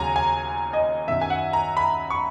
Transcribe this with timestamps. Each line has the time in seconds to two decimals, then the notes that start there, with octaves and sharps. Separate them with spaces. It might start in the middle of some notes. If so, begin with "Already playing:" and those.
Already playing: D#2 C#3 F#3 G#5 A#5
0.16 G#5
0.73 D#5
1.08 F#2 D#3 F#3 E5
1.22 G#5
1.30 F#5
1.53 A#5
1.77 B5
2.10 C#6